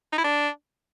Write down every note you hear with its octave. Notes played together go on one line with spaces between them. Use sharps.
D#4
E4
D4